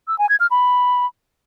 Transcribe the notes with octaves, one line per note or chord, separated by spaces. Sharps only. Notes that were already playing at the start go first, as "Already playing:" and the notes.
E6
G#5
G#6
F6
B5